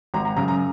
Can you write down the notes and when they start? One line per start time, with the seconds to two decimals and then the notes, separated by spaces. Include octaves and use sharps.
0.14 G#1 A#5
0.25 A#5
0.37 F#2 C#3 A#5
0.48 A#5